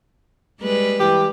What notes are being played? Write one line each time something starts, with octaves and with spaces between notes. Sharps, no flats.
G3 G#3 B4
E3 G4